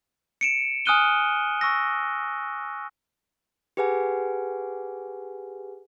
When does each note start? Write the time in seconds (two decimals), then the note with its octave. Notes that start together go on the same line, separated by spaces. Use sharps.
0.41 C#7 D7 E7
0.86 G#5 D#6 F6 F#6 D#7 G7
1.61 C#6 E6 A#6
3.77 G4 G#4 B4 F#5 G#5